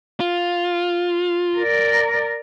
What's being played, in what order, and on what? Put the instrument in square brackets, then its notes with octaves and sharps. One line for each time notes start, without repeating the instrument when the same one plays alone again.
[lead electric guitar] F4
[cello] A#4 D5